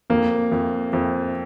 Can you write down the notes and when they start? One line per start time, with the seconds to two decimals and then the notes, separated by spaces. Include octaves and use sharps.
0.10 F2 A#3
0.52 F2
0.93 F2